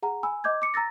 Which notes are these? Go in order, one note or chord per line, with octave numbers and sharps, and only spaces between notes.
G#4 F#5 A#5
G#5 B5 E6
D#5 D6 G6 G#6
D6 C#7
A#5 E6 A6 A#6